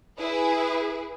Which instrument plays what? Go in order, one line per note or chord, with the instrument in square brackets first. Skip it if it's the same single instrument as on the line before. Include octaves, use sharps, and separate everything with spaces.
[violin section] E4 G#4 B4